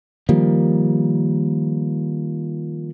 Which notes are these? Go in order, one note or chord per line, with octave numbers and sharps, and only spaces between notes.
D#3 F3 G3 A#3